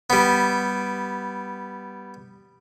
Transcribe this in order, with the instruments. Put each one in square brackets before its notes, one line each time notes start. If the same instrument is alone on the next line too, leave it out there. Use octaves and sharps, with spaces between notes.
[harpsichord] G3 B3